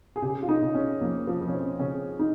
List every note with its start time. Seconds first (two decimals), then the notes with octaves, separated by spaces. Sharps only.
0.16 G#4
0.22 C#3 G4
0.42 F4
0.49 D#4
0.62 C#3
0.75 C#4
1.01 F2 A#3
1.27 F3
1.41 F2
1.48 C#4
1.54 C4
1.79 C#3 C#4
2.19 D#4